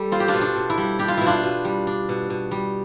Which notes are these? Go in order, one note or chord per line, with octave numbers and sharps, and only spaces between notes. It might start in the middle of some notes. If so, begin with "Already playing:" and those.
Already playing: G3 A4
C4 F4
G4
D4 F4
B2
D4
B2
E4
G3
D4 G4
F4
B2 E4
D4 F4
B2
G3
D4
B2
B2
G3